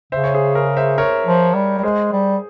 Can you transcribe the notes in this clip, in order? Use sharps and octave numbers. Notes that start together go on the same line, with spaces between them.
C#3 C5 E5
C#5
G#4 C5
A#4 C#5
C5 E5
A#4 C#5
F3
G3
G3
G#3 G#4 C5
G3